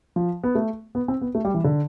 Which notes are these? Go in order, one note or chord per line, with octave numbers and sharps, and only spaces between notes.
F3
B3
A3
B3
C4
B3
A3
G3
E3
D3